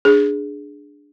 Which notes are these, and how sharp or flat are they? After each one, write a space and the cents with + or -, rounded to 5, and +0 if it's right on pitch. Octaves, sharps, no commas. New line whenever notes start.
D4 +0 G#4 +0